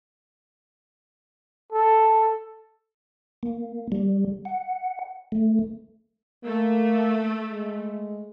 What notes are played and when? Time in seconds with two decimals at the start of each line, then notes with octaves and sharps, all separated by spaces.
1.72 A4
3.43 A#3
3.92 G3
4.45 F#5
5.32 A3
6.44 A3 A#3
7.50 G#3